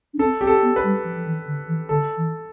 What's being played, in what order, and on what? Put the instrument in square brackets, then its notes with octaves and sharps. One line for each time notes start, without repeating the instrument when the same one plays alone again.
[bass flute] D4
[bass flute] C4 [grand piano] A4
[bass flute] C4 [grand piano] G4
[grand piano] A4
[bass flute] B3
[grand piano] B4
[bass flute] G3
F3
F3
E3
D3
E3
[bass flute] D3 [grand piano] A4
[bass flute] E3